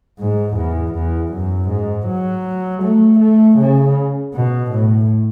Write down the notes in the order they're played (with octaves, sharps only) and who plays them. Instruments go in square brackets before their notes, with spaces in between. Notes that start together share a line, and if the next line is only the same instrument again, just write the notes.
[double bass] G#2
E2
E2
F#2
G#2
F#3
A3
A3
C#3
B2
A2